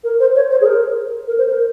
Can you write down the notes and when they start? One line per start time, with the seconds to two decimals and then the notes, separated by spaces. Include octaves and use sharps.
0.04 A#4
0.20 C5
0.35 C#5
0.50 C5
0.61 G#4
0.65 A#4
1.27 A#4
1.38 C5
1.48 A#4